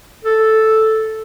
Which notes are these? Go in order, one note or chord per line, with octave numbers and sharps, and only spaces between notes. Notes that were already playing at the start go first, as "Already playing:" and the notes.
A4